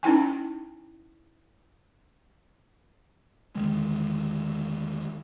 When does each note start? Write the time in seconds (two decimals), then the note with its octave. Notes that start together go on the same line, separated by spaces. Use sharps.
0.03 C#4 D#4 E4 G5 G#5
3.55 E2 D3 D#3 G#3